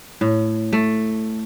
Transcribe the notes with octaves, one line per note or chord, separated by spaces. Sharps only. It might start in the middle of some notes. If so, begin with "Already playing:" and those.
A2
A3